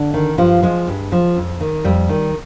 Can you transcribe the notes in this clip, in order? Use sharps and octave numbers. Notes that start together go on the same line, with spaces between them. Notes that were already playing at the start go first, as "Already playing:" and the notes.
Already playing: D3 D4
D#3
G2 F3 F4
F3 G#3
G2
F3
F2
D#3
F2 G3
D#3